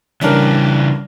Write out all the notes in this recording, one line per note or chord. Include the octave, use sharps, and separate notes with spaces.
C#3 E3 G3 C#4 D4 A#4